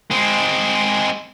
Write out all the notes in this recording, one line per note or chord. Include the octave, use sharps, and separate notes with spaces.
G#3 C4